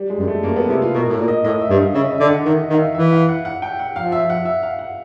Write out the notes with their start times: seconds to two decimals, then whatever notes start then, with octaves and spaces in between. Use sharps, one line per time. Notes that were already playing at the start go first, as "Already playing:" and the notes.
Already playing: G3
0.10 G#3
0.19 F#2
0.28 A3
0.43 F#2 A#3
0.56 B3
0.69 C3 E4
0.82 F4
0.94 B2 A#4
1.09 A2 A#4
1.19 A#2
1.28 D#5
1.44 A2 D#5
1.61 E5
1.70 G2
1.78 F5
1.94 C#3 E5
2.04 D#5
2.11 E5
2.20 D3
2.28 F#5
2.45 D#3 E5
2.62 D#5
2.70 D#3
2.74 F5
2.78 E5
2.95 E3 E5
3.12 F5
3.29 F#5
3.45 F#5
3.62 G5
3.79 F#5
3.96 F3 F5
4.12 E5
4.30 F#5
4.45 E5
4.63 F5
4.79 F#5